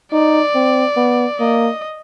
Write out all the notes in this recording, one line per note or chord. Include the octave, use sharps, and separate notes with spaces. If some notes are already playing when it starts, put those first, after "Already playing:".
D#4 D5
C4
B3
A#3 D#5